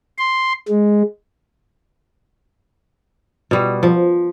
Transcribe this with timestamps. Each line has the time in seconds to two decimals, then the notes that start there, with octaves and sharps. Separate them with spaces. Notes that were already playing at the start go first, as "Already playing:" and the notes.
0.18 C6
0.69 G#3
3.51 B2 G3
3.83 F3